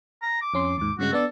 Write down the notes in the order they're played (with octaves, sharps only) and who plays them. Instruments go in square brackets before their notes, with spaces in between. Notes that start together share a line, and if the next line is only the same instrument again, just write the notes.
[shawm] A#5
D6
[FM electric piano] F2 C#4 C6
[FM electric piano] D#2 G#2 [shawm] D6
[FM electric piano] G2 C#3 G#3 [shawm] F#4
[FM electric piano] B3 D4 D5 [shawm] A4